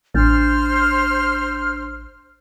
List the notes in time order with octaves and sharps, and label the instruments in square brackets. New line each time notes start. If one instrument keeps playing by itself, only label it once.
[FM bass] A1 [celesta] D4 G6 A6 [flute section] C5 F6